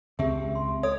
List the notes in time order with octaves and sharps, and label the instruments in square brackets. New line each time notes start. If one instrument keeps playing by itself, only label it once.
[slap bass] C#2 C4 [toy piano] G4 G#4 E5
[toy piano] C6
[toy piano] A4 D#6 [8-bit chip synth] C#5